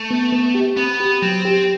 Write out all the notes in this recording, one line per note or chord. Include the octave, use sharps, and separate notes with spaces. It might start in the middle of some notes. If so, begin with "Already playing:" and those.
Already playing: A3
B3
B3
G4
B3 C4
G4
F#3 C4
G4